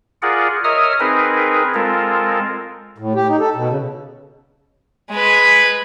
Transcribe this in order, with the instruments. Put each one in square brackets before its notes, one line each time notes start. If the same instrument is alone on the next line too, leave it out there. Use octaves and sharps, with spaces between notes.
[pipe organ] F4 G#4 A#4 D5 F#5
A#4 C#5 D#5 E5 D#6 F6
C4 D#4 G#4 A#4 B4
G#3 C4 F4 A4 A#4
[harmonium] A2
G4
D#4
A4
B2
C#3
[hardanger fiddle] G#3 B4